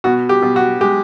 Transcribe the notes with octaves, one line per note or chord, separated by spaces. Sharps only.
B2 F#4
G4
B2
F#4
G#3 G4